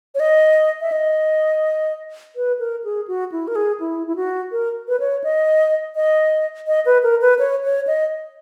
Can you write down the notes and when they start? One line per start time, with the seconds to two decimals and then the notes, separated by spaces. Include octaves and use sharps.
0.15 C#5
0.20 D#5
0.81 E5
0.92 D#5
2.36 B4
2.59 A#4
2.84 G#4
3.08 F#4
3.32 E4
3.48 A#4
3.56 G#4
3.80 E4
4.07 E4
4.16 F#4
4.52 A#4
4.88 B4
5.00 C#5
5.24 D#5
5.95 D#5
6.67 D#5
6.85 B4
7.03 A#4
7.21 B4
7.39 C#5
7.64 C#5
7.87 D#5